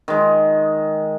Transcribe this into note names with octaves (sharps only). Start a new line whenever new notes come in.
D#3 G#3